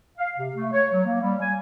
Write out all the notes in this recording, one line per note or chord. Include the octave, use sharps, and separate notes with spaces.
F5
C3
A3
C#5
F#3
A#3
G3
G#5